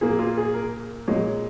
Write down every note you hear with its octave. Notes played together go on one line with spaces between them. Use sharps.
A#2 A#3 G#4
F4
G#4
A#4
A#2 G#3 C#5